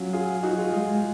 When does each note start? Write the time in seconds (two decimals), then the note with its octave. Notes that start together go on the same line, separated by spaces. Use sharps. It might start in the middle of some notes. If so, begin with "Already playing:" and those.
Already playing: F#3 C#4 F4
0.13 F4 G#4
0.43 D#4 F#4
0.58 F4 G#4
0.73 G#3 F4 G#4